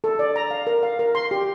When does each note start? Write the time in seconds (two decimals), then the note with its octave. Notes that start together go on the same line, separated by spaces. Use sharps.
0.04 A4
0.19 D5
0.36 A#5
0.51 F5
0.67 A#4
0.83 F5
0.99 A#4
1.15 C6
1.31 G4